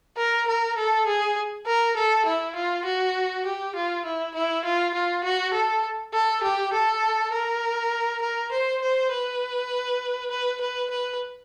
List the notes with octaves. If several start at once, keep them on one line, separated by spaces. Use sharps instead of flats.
A#4
A#4
A4
G#4
A#4
A4
E4
F4
F#4
G4
F4
E4
E4
F4
F4
F#4
A4
A4
G4
A4
A#4
A#4
C5
C5
B4
B4
B4
B4